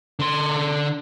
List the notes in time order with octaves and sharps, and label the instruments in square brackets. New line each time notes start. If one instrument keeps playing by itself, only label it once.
[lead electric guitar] D3 C6